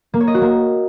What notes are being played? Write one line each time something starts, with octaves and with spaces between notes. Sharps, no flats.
A#3
C#5
D#5
F#4
A#3